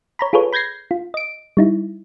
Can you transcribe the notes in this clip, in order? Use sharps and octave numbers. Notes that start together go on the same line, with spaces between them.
C#5 A#5 B5
F4 G#4 A4 B4 C#5
B5 G6 G#6 A#6 C7
F4
D#5 D7
G3 D#4 E4